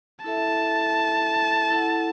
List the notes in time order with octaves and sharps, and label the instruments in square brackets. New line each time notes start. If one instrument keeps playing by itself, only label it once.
[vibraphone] E4 A4 E5 [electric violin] A5
[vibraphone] E4 A4 F#5